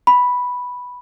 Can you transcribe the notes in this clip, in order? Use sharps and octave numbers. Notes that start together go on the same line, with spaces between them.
B5